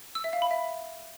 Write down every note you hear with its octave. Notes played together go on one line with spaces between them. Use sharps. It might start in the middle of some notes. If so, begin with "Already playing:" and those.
E6
E5
F5
B5
E5